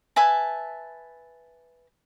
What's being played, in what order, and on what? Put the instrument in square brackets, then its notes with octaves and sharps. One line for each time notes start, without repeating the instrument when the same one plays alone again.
[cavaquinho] B4 E5 G#5 A5